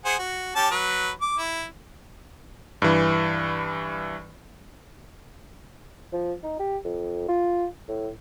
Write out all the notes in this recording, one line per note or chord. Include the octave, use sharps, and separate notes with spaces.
G#4 C5 F#5
F#4
C#4 G4 A5
F#3 B4
D6
E4
G2 E3
F3
D#4
G4
F2
F4
A2